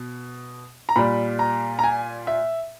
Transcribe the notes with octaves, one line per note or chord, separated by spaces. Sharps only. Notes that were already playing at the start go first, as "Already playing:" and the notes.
Already playing: B2
A#5
A#2 G3 B5
A#5
A#5
G#5
E5